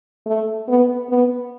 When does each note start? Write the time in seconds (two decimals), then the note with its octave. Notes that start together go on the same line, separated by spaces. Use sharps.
0.26 A3
0.68 B3
1.10 B3